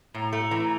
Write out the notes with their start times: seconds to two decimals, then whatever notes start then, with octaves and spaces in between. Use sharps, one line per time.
0.14 A2 A#5
0.33 A3
0.51 E3